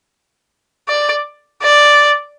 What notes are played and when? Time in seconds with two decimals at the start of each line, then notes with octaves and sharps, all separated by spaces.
0.89 D5
1.62 D5